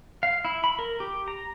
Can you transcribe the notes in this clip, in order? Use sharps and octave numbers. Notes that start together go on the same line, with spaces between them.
F5
E4
B5
A#4
G4
A#5